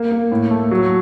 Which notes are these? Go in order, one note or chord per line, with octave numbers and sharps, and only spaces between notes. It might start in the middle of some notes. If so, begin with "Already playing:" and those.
Already playing: A#3
A#3
A2
A3
F#3